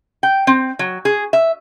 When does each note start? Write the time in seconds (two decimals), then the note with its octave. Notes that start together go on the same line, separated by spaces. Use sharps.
0.23 G5
0.47 C4
0.79 F#3
1.05 G#4
1.33 E5